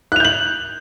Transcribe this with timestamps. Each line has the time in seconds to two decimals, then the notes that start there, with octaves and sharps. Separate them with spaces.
0.12 F#6
0.16 F7
0.20 G6
0.24 F#7